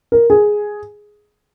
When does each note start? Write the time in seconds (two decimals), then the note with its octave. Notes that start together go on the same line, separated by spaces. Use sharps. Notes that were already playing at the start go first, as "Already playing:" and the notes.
0.12 A#4
0.30 G#4